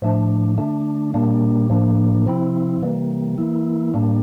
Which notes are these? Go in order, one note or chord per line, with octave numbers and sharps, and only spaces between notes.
A2 F3 A3 D4
D3 A3 D4
A#2 G3 A#3 D4
A2 F3 A#3 D4
C3 F3 C4 E4
C3 E3 G3 A#3
E3 A#3 E4
A2 G3 A#3 D4